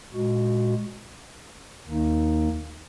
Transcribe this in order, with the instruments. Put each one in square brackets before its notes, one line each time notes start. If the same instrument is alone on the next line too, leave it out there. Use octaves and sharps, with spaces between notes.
[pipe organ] A#2 G#3 F#4
D#2 D#3 A#3 D#4